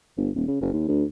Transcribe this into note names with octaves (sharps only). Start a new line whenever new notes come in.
G1
D#1
C#3
F#1
D#2
D2